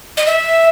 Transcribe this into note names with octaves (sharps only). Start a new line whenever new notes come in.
D#5
E5